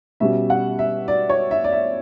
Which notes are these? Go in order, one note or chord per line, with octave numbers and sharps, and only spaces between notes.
B2 G3 C#4 E5
F#5
E5
D5
C#5
E5
D5
E5